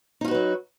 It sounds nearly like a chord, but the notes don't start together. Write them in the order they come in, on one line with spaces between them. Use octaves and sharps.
D#4 F4 F#4 B4 F#3